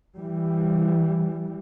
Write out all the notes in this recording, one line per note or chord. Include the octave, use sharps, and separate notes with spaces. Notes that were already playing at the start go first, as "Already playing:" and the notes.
E3 G3